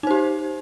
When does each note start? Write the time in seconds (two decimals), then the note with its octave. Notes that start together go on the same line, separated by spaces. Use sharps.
0.03 D#4
0.07 C5
0.11 G4